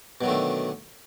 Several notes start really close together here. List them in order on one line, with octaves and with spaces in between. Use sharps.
B2 F#3 D#3 A3 D3